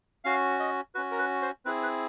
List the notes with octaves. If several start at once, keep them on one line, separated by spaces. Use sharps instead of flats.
C#4 F#4 F5
D#5
C#4 F#4 B4
A#4
B4
C5
C4 E4 G#4 B4
B4